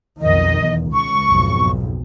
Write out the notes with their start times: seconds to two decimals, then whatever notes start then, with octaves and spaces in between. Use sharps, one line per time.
0.21 B1 F2 D#3 D#5
0.61 E2
0.90 C#2 C#6
1.27 B1 F2 G#2